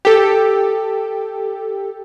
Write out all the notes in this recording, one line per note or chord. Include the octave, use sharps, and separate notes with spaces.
G4 A4